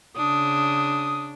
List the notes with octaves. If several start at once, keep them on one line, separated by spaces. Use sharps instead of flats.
C#3 D4 D#6